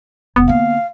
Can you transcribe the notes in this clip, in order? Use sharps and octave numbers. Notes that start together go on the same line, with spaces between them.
E1 C#2 B3
D3 A#3 F5